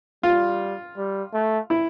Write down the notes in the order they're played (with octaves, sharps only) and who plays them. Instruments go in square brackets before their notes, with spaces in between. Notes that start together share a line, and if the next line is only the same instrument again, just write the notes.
[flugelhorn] G3 [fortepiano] F4
[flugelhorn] G3
A3
[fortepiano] E4